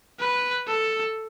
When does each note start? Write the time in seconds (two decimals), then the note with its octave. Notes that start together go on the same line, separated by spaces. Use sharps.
0.19 B4
0.67 A4